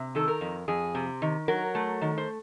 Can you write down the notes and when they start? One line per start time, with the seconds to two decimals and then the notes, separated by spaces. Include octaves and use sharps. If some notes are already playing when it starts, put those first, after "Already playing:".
Already playing: C3
0.15 D#3 A4
0.28 A#4
0.41 F2
0.68 F2 G#4
0.95 C3
1.22 D#3
1.48 F#3 A#4
1.75 A3
2.02 D#3
2.18 C5